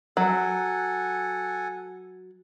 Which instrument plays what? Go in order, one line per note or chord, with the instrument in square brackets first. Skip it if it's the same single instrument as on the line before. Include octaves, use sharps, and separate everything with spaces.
[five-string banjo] F#3 [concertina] A4 F#5 G#5